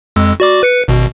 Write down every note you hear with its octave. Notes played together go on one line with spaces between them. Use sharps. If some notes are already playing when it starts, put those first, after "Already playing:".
F2 G#3 E6
F#4 D5 D6
B4 C#7
G#1 B2